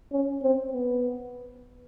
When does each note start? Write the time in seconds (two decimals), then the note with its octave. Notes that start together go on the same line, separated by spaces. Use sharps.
0.12 C#4
0.43 C4
0.73 B3